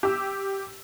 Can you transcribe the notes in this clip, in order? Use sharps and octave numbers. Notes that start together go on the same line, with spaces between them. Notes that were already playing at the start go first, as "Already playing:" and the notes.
G4 E6